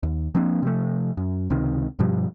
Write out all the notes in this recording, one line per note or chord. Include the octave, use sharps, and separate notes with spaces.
D#2
F3 A#3 C4 D4
C3 F3 A3
F#2
C#2 C3 D#3
G2 B2 F3 G3